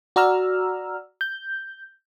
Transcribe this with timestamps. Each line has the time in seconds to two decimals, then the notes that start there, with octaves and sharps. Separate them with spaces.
0.16 F#4 D5 A#5 E6 F6
1.21 G6